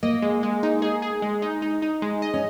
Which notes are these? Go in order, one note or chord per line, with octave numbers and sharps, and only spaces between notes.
A#3 D#5
G#3
G#3
D#4
G#4
G#4
G#3
D#4
D#4
D#4
G#3
D#5
C#4